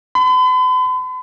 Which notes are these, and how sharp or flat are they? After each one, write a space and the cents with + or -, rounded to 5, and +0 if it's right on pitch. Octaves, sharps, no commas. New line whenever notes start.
B5 +45